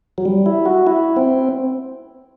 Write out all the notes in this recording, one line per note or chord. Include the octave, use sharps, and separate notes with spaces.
F#3
G3
E4
F#4
E4
C4